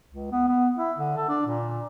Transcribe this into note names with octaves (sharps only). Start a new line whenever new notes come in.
C#2
B3
B3
E4
D3
A4
D4
A#2